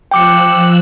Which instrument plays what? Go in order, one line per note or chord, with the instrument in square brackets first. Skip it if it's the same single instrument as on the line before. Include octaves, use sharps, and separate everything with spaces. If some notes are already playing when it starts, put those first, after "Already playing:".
[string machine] F3 E6 F#6 [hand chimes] G5 D6 C#7